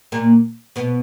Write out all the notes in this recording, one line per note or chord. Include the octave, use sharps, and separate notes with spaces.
A#2 A#3
B2 B3